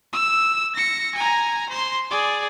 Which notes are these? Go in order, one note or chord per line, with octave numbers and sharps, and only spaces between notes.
E6
A#6 C#7
G#5 A#5
C5 C6
G#4 D5